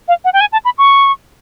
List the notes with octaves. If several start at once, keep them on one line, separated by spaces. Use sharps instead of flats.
F5
F#5
G5
G#5
A5
B5
C#6